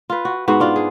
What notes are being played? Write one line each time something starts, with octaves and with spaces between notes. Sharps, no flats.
F4 B4
F#4
G#2 B3 F#4
D4 F4
G#4